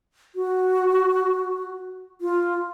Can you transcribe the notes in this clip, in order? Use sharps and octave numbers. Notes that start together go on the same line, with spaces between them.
F#4
F4